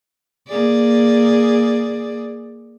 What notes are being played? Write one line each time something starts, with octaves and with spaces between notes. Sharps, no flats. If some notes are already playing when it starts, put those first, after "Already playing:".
A#3 G#4 D5